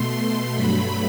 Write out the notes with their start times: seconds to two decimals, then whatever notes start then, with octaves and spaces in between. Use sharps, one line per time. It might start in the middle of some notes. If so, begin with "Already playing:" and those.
Already playing: B2 A3 C6
0.54 G2 F#3 A3 B5